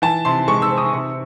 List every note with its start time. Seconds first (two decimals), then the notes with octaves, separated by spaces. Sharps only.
0.02 E3 A5
0.25 C3 C6
0.48 G#3 C#6
0.62 E6
0.70 C4
0.78 D#6
0.93 C3 C#6